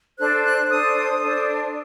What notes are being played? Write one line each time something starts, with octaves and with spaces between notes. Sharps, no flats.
D4 A4 C5 F#6
F#6
D4 A4 C5 D#6
D4 A4 C5